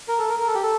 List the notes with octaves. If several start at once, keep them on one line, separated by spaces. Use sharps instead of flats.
A#4
A4
A#4
A#4
A4
G4
A4